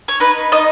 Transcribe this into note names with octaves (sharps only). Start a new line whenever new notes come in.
C#5
D#4 B4
D#4 D#5